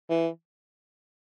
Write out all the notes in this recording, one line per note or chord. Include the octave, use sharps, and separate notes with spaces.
E3